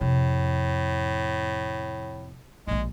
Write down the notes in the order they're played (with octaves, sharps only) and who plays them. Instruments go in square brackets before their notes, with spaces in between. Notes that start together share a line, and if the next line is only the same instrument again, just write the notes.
[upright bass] F2 C3 [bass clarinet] A2
[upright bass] A#1 A#2 [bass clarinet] G#3